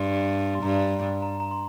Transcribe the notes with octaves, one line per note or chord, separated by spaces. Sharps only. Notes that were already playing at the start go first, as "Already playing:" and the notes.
Already playing: G2 C6
C6
G2 A#5
A#5
A#5
C6